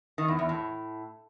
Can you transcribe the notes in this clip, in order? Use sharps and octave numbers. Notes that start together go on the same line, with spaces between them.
D#3
E2
E2
A2